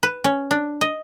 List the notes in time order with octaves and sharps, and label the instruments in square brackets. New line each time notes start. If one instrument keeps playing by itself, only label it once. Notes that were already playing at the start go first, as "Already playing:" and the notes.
[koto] B4
C#4
D4
D#5